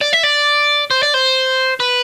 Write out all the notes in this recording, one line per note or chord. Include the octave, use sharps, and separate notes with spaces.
D5
E5
D5
C5
D5
C5
B4